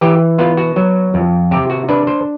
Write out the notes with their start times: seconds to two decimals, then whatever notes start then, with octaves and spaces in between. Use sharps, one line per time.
0.01 E3 G4
0.38 B3 F4
0.57 F#4
0.76 F#3
1.14 F2
1.51 C3 G4
1.70 F#4
1.89 D4 B4
2.07 C5